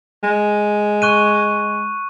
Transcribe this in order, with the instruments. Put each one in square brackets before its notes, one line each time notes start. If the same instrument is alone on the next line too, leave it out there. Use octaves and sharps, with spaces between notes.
[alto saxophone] G#3
[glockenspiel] C#6 F#6 D#7